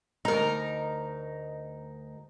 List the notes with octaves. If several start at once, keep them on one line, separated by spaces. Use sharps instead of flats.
D2 D#4 A#4 A#5